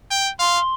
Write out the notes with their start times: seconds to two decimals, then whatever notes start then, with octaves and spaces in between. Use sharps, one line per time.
0.11 G5
0.39 F5 C6